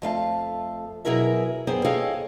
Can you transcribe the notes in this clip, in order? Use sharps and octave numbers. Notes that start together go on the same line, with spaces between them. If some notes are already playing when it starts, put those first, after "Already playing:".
F2 A3 F5 A5
B2 F#3 E4 G#4 A#4 E5
F#2 B3 G#4 C5 G5
G#4 A4 C#5 D#5 F5 G5